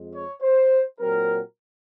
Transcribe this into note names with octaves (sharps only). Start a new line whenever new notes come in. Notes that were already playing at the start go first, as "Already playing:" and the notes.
Already playing: F2 G#3
C#5
C5
A#2 F#3 C4 A#4